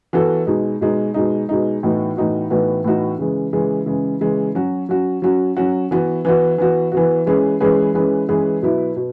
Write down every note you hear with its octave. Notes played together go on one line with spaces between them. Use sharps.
E3 B3 F#4 A4
B2 G#3 D#4
B2 G#3 D#4
B2 G#3 D#4
B2 G#3 D#4
A2 E3 B3 D#4 F#4
A2 E3 B3 D#4 F#4
A2 E3 B3 D#4 F#4
A2 E3 B3 D#4 F#4
C#3 E3 G#3
C#3 E3 G#3
C#3 E3 G#3
C#3 E3 G#3
F#3 C#4 F#4
F#3 C#4 F#4
F#3 C#4 F#4
F#3 C#4 F#4
E3 B3 F#4
E3 B3 F#4
E3 B3 F#4
E3 B3 F#4
E3 G#3 C#4 G#4 B4
E3 G#3 C#4 G#4 B4
E3 G#3 C#4 G#4 B4
E3 G#3 C#4 G#4 B4
B2 F#3 B3 E4
B2